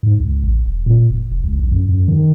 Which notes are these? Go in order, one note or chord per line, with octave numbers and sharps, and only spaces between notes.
G#2
C#2
A1
E1
A#2
F1
F1
C#2
B1
F#2
F#2
D#3